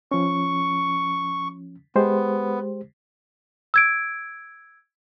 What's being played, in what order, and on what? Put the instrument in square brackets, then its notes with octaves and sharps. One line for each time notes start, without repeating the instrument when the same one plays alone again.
[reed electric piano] F3 C#4 [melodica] C#6
[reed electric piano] G#3 G4 C5 [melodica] B3
[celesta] E6 G#6 D7